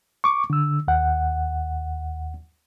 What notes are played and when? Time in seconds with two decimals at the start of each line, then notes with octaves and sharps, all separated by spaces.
0.24 C#6 D6
0.50 D3 E6
0.88 D#2 F#5